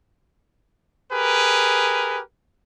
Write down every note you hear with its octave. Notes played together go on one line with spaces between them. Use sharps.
G4 G#4 A#4 B4